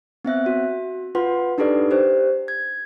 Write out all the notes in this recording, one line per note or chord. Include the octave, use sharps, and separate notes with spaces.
B3 C4 E5 F#6
F#4
F4 B4 F#5 C6
D4 D#4 G4 A4 B4 D5
G4 C5
G#6